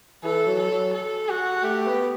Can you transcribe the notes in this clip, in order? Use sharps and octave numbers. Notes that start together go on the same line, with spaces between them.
E3 A4
F#3
A4
F#3
A4
F#4
A3 G4
B3